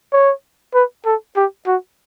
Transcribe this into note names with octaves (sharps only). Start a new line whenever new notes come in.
C#5
B4
A4
G4
F#4